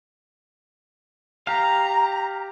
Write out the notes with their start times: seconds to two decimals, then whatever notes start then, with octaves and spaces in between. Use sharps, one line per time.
1.47 G4 F5 A#5